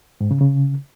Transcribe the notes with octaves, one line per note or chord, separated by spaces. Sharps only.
G#2
C#3
C#3